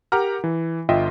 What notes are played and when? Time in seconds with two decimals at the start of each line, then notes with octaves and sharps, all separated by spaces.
0.12 G4 A#4 F#5 A#5 F6
0.44 E3
0.89 G1 F4 D#5 E5 G5